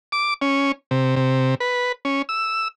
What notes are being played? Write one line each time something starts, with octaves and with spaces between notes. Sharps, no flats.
D6
C#4
C3
C3
B4
C#4
E6